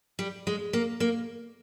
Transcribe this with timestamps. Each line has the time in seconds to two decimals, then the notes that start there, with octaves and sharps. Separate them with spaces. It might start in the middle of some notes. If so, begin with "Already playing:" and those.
0.19 G3
0.47 G#3
0.73 A#3
1.00 A#3